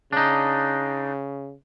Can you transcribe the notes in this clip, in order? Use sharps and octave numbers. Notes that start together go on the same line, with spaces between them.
C#3 D4 D#4